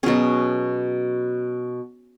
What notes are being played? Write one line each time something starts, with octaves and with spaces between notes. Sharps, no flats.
B2 F#3 C#4 G#4